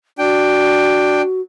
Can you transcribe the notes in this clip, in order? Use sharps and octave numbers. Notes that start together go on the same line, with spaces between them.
D4 F#4 G5